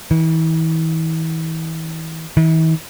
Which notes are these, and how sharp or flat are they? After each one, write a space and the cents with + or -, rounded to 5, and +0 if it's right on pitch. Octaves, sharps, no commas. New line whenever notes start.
E3 -40
E3 -45